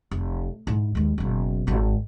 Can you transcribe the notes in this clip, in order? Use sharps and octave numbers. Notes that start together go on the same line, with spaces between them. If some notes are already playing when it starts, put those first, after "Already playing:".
F1
G#2 E4
D#2 G#3
F#1 B2
G#1 G#2